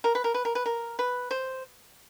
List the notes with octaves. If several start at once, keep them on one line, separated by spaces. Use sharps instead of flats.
A#4
B4
A#4
B4
A#4
B4
A#4
B4
C5